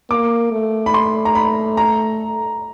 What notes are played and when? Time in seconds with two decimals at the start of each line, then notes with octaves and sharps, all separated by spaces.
0.11 A#3 D6
0.52 A3
0.86 B5
0.94 C6
1.25 A#5
1.35 B5
1.77 A#5